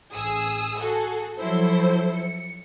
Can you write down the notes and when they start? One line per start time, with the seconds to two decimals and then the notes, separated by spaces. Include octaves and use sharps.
0.12 A1 G#4 D#6 E6
0.79 F#4 G#4 A4
1.38 F3 F#3 E4 A4 C5
2.16 C#7